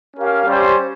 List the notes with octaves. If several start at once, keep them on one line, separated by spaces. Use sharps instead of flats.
C#4 G4 A#4 F5
G3 C#4 G4 C5